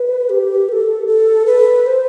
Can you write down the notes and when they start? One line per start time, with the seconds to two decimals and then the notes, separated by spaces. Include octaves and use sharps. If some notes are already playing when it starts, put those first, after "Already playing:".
Already playing: B4
0.30 G4
0.69 B4
0.72 A4
1.07 A4
1.46 B4
1.86 C5